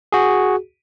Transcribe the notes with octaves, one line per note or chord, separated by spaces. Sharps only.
F#4 G#4